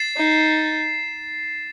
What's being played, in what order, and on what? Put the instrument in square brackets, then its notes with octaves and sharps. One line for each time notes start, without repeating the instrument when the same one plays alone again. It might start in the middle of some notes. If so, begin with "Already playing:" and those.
Already playing: [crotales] A6 C7 E7
[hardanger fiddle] D#4